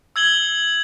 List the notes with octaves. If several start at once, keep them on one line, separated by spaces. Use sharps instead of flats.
E6 G#6 F#7 G7